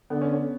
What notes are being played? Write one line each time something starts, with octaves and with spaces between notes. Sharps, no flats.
D3 B3
C#4
C#4